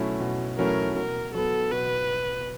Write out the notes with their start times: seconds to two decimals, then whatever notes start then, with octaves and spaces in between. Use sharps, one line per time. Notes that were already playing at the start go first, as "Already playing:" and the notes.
Already playing: B2 F#3 A3 C#4 E4
0.20 B2
0.59 F#3 A3 C#4 E4 A#4
0.96 B2 A#4
1.35 F#3 B3 A4
1.71 B2 B4